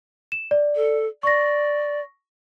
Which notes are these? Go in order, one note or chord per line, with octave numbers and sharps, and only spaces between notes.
E7
D5
A4
D5 C#6 A#6